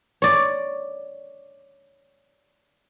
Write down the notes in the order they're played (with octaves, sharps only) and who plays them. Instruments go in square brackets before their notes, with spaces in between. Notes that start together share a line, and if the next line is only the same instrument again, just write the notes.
[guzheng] C#5 D5